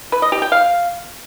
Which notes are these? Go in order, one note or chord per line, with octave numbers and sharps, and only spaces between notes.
B4
D#5
G4
G5
F5